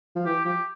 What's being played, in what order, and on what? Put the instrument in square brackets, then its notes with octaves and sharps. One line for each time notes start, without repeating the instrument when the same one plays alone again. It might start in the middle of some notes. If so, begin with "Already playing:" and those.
[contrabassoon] F3
[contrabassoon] E3 [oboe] G4
[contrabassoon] F3 [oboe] G4